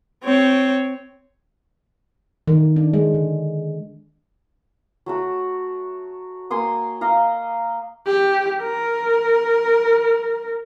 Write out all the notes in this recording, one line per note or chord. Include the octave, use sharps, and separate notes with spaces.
C4 C#5
D#3
D4
G#3
D3
F#3 A3 F#4
A#3 G#5 C6 D#6
D#5 F5 A#5
G4
A#4